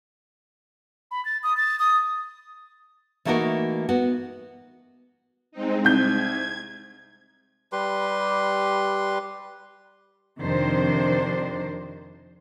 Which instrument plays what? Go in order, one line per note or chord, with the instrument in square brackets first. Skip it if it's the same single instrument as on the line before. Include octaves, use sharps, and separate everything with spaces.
[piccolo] B5
A6
D#6
A6
D#6
[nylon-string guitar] E3 A3 A#3 D#4 F#4 A#4
B3 F#4
[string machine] G#3 C4 D#4
[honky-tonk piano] C2 G6 [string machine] G#6
[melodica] G3 G4 B4 C6
[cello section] F2 C3 D#3 D4 C5